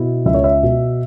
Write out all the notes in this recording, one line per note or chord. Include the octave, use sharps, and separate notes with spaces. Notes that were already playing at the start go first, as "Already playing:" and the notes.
Already playing: B2 E4
C#2 E5
C#5
E5
B2